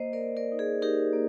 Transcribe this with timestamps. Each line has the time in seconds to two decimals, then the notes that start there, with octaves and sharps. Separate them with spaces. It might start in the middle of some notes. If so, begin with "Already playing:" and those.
Already playing: A#3 C5 D#5
0.13 A#4 D5
0.21 A#3
0.37 A#4 D5
0.52 D#4
0.59 G#4
0.82 D#4 G4 A#4
1.13 A#3